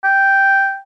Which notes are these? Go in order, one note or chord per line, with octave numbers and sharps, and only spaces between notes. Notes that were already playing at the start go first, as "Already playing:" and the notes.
G5